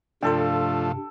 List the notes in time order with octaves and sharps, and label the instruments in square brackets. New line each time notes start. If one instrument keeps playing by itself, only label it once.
[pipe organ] G2 C3 [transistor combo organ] F3 A3 [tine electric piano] D4 F4 [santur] A4 G5